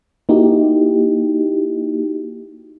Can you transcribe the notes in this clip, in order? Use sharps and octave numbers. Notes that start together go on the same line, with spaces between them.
A#3 D#4 E4 F#4 G4